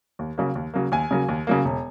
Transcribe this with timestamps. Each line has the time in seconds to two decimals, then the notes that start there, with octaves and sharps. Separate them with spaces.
0.19 D#2
0.38 C#3 F#3 A#3
0.55 D#2
0.74 C#3 F#3 A#3
0.92 D#2 G#5
1.11 C#3 F#3 A#3
1.29 D#2
1.47 C#3 F#3 A#3
1.65 E1